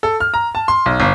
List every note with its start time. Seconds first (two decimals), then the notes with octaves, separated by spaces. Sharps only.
0.03 A4
0.20 F6
0.34 A#5
0.55 A5
0.68 C6
0.86 B1
1.00 G1